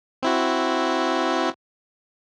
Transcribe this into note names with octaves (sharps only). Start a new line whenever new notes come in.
C4 E4 F#4